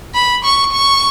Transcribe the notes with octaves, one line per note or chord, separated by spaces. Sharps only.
B5
C#6
C#6